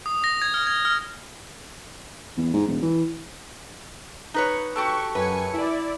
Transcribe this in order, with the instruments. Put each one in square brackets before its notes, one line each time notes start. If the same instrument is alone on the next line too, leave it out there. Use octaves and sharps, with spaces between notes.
[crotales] D#6
A#6
G#6
F6
G#6
F6
[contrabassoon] E2
G#2
E1
E3
[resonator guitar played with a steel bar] D#4 B4 C#5
[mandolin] F#4 G4 A4 [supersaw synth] C#6
[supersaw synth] F#2 G#5 C#7 [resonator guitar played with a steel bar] B4
[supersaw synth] E4 D5